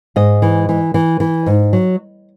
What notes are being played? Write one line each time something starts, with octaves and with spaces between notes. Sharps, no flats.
G#2 D#5
E3
E3
E3
E3
G#2
F#3